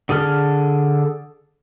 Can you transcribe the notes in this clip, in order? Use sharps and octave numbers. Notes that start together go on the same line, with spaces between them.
D3 G#4 A4 F6